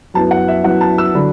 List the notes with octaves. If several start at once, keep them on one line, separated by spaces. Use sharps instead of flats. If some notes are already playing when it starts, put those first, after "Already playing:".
F#2 F#3 B3 E4 A5
F#5
E5
F#2 F#3 B3 E4 F#5
A5
E6
D3 F#3 D4 B5